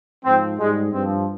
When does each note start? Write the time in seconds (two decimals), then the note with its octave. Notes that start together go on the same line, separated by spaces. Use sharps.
0.25 G#2 F3 C4
0.58 G#2 G3 G#3
0.91 G2 F3 C4